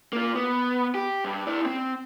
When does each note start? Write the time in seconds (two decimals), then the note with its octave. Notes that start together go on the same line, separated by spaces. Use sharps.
0.13 A#3 F4
0.35 B3
0.95 G4
1.25 G2
1.47 E4 D5
1.66 C4